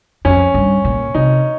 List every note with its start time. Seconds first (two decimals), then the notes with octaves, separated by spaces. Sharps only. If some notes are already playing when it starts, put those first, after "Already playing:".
0.25 F2 C#4
0.54 G2
0.84 A#2
1.14 C3 D#4